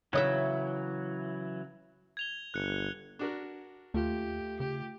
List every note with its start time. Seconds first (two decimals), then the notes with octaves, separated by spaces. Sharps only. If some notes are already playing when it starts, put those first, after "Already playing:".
0.13 C#3 E3 F#3 D#5 E5
2.17 G#6 F7 G7
2.54 G1 F#6 C#7
3.19 D4 F#4 A#4
3.94 D#2 A3 F4 G4
4.60 C#3 G4